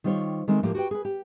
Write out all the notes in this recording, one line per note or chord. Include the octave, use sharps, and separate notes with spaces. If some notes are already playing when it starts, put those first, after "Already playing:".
D#3 G3 F4 C5 C#5
D#3 G#3 A3 C4
A2 F3 A3 A#3 G4
F#4 G4 B4 G5
G#4 B4
G4